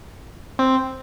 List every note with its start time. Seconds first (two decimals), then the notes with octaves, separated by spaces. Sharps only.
0.59 C4